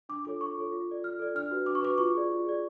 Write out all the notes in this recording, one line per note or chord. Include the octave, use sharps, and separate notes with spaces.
D4 D6
F4 A4 C#5 D6
D4 C#6
F4 A4 C#5
F4
A4 D5
F4 F6
A4 D5
D4 F6
F#4 B4
D4 D6
C#6
F#4 B4 D6
F4 C#6
G#4 D5
F4
G#4 D5